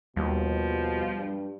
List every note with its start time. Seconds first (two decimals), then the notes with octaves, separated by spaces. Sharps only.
0.16 D#2 B2 F3 G3
1.18 G2